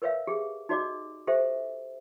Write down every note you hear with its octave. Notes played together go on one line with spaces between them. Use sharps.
A#4 B4 C#5 E5 F5
G4 G#4
D#4 F#4 D5 D#5 D6
G4 A4 C5 E5